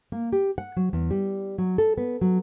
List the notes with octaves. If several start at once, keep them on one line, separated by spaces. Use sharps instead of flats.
A#3
G4
F#5
F#3
E2
G3
F#3
A4
B3
F#3